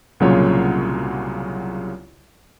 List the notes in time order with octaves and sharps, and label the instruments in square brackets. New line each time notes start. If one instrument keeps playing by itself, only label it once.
[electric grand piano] C2 A#2 C#3 F#3 F4 C#5